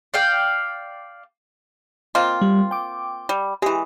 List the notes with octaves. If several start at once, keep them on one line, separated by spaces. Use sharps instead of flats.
D5 F5 G5
A#3 C4 F4 D#5
G3
G5 D6
G3
E3 G#3 G4